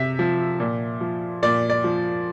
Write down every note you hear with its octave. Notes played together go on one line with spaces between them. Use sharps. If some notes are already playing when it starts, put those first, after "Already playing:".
Already playing: C3 E5
F3
A#2
F3
A#2 D5
D5
F3